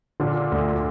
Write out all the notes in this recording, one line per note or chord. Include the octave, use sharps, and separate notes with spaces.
A#2 D3
D2